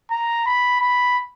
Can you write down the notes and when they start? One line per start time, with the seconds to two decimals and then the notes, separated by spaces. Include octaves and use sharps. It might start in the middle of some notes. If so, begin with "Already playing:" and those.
0.10 A#5
0.46 B5
0.80 B5